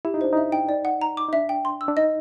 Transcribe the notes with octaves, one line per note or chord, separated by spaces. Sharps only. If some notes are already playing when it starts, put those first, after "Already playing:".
E4 G4
D#4
D4 C5
D#4 E5
G5
D5
F#5
A#5
D6
D#4
D4 E5
G5
C6
E6
D4
D#4 D#5